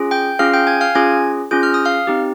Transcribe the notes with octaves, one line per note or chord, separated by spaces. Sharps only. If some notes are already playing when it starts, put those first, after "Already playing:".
Already playing: C#4 F4 G#4
G5 G6
C#4 F4 G#4 F5 F6
G5 G6
G#5 G#6
F5 F6
C#4 F4 G#4 G#5 G#6
C#4 F4 G#4 G6
F6
D#6
F5 F6
C4 D#4 G4